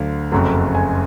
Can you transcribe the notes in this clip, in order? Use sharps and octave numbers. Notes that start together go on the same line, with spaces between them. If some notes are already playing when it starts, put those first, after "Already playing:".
Already playing: D2 D3 F#3 F5
F#1 F2 C#3 F#3 A3
G#5